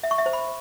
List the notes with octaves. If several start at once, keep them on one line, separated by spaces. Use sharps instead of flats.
E5
C#6
E5
C5
B5